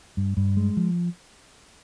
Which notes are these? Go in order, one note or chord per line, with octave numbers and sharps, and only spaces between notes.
G2
G2
G#3
F3